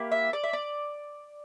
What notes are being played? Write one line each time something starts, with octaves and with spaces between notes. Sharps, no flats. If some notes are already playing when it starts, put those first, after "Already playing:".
Already playing: A#3 E4 G4
E5
D5
E5
D5